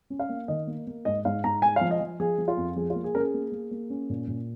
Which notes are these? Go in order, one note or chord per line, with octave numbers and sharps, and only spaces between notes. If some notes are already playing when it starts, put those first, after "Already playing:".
C#4
F5
A#3
D#3 D#5
A#3
A#3
G#2 D#5
G#2 F5
G#2 A#5
G#3 G#5
F3 F5
D#5
F3
F3 G#4
F3
F4
F2
F3 G#4
F4
A#3
G#4
C#4 G#4 A#4
A#3
A#3
A#3
C#4
A#2
A#2